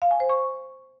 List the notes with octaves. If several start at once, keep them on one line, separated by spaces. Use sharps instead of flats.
F5
G#5
C5
C#6